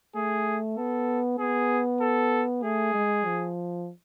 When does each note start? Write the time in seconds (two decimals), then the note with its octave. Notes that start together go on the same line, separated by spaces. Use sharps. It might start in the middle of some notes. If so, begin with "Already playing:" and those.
0.15 A3 G#4
0.77 B3 A4
1.39 B3 G#4
2.01 A4
2.63 A3 G#4
2.94 G#3
3.25 F3